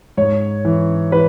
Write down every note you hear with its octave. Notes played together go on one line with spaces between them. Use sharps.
G#2 C#5
E3
E3 B4